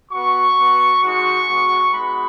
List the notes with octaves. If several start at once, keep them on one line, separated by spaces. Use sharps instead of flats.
B3 F#4 C#6
B3 F#4
G#3 D#4 F#4 C#6
G#3 B3 F#4
G#3 B3 D#4 F#4 B5